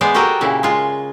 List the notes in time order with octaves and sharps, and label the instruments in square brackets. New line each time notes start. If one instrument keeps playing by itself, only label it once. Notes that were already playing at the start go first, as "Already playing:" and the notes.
[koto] G#3 B3 C5 D5
F#4 G4 A4 A#4 D#5 G5
A#2 C#3 E4
G#3 F4